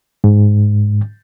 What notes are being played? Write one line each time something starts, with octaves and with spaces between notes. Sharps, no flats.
G#2